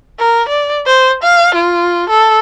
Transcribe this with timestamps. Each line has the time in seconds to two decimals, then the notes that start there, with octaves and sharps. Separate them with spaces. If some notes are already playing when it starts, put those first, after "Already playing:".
0.19 A#4
0.49 D5
0.87 C5
1.23 F5
1.55 F4
2.10 A4